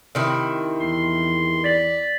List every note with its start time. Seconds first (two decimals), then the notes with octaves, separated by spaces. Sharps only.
0.15 C3 D#3 E4
0.80 E2 C6
1.64 D5 A6 B6 F#7